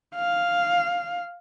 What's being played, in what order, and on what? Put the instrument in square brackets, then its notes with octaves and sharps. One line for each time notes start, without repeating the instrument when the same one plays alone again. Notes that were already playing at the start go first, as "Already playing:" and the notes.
[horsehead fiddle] F5